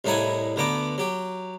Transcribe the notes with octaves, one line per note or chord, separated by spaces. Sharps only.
C2 A2 D#4 E4 F#5 G#5
D2 D3 B3 A#5 D6
F#3 G4